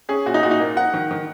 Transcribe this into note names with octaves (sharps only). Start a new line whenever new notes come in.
C#4 G#4
A#2 F#4
D#4
A#2 F#4
D#4
A#3
D#4 F#5
D#3
D#3